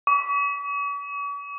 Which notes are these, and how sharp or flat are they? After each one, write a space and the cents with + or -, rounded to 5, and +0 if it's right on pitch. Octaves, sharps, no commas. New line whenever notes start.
C#6 +45